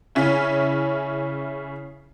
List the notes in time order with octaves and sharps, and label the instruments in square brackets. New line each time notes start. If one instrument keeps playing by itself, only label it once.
[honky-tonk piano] C#3 C#4 E4